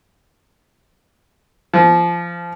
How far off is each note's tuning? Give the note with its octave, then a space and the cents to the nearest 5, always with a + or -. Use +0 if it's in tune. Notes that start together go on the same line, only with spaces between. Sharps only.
F3 -20